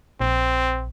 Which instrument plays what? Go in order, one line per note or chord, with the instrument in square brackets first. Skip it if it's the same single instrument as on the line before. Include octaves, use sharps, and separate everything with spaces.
[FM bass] A#1 [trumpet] C4